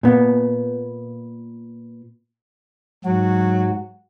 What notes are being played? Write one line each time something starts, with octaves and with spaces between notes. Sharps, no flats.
A#2 B3
G#2 F#3 F#4